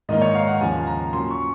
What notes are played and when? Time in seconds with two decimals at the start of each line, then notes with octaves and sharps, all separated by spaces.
0.09 G#2 D#3 A#3 D#4 D#5
0.22 C#5
0.35 F5
0.47 F#5
0.61 D#2 C#3 F3 G#5
0.87 A#5
1.13 A#2 F#3 C#4 C6
1.31 C#6